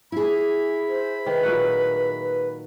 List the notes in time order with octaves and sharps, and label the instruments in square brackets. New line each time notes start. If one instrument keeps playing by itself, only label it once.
[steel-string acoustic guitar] E4 G#4 [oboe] B5
[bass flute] C5
[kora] D#3 [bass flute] B4
[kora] A#2 F#3 F#5
[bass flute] B4